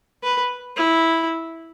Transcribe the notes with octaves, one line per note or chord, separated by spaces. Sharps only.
B4
E4